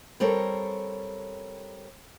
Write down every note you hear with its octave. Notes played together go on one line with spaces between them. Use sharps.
G3 C4 A4 A#4 C#5